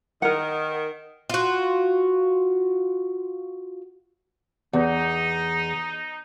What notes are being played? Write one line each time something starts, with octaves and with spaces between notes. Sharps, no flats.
D#3 A#4 F#5
F4 F#4
E2 D#4